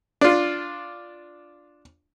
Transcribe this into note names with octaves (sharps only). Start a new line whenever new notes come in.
D4 F4